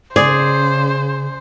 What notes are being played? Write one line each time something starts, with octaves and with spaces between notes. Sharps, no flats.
C#3 G#4 C5 D5